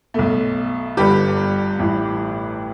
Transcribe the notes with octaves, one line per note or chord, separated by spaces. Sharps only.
B1 B2 A3
G1 G2 D3 G4 B4
A1 A2 E3